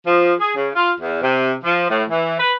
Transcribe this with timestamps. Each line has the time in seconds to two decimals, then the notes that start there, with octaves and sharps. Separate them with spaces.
0.07 F3
0.40 G#4
0.57 C#3
0.75 F4
1.01 E2
1.22 C3
1.64 F3
1.90 A2
2.10 E3
2.39 B4